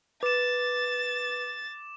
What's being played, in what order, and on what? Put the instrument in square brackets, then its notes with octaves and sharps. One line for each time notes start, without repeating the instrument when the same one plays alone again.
[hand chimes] B4 [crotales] D6 E7 [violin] A6